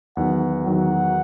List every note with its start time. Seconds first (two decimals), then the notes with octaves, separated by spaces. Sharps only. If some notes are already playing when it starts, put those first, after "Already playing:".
0.16 E2 D#3 F#3 F#5
0.66 E2 D#3 F#3 F#5